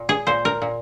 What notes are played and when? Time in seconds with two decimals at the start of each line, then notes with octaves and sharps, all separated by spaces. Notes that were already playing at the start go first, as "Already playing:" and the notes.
Already playing: A#2
0.09 G#4
0.27 A#2 C5
0.45 A#4
0.62 A#2